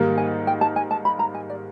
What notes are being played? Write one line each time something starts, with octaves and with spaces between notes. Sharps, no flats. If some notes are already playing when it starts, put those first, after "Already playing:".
Already playing: G#2 D#3 G3 A#3
G#5
G5
A5
G#5
A5
B5
A#5
G#5
D5